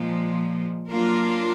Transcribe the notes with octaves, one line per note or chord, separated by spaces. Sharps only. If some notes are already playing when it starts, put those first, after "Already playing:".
Already playing: A#2 F3 G#3
F#3 A#3 D4 F4 A#4